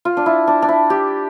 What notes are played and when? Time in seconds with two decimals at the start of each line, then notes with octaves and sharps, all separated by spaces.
0.05 F4
0.17 D4
0.26 E4
0.47 D4
0.62 D4
0.69 E4
0.90 G4